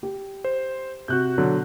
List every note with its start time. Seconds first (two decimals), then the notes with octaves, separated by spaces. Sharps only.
0.03 G4
0.44 C5
1.08 C3 F#4 F#6 G6
1.38 B2 D3 F#3